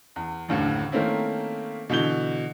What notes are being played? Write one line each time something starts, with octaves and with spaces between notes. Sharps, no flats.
E2
F#1 D#2 A2 D3
D#3 A3 A#3 C4 C#4 E4
B2 D3 E3 G6 G7